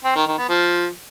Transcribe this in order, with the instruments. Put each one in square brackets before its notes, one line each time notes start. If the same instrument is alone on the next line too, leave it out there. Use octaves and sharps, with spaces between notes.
[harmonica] C4
D#3
D#3
B3
F3